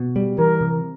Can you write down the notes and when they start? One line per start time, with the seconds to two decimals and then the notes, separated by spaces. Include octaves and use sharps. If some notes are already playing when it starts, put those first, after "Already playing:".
Already playing: B2
0.16 G3
0.38 E3 A#4
0.61 C3